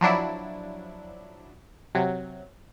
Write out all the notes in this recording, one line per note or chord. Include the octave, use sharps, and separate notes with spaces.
F3 F#3 D4 E4
C3 F#3